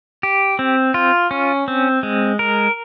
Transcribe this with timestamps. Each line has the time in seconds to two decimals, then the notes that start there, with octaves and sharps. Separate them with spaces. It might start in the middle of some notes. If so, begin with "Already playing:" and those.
0.23 G4
0.59 C4
0.94 F4
1.31 C#4
1.68 C4
2.03 G#3
2.39 A#4